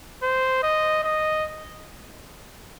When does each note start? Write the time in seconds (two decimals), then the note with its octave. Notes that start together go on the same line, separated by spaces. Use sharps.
0.23 C5
0.63 D#5
1.04 D#5